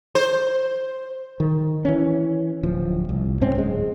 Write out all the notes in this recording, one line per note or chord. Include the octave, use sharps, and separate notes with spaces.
C5
D#3
E3 C#4
D1 F3
C2
G#2 C4 C#4
D1 G#3